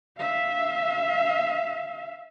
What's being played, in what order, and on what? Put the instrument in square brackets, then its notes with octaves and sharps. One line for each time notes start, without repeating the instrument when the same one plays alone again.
[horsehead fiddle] E5 F5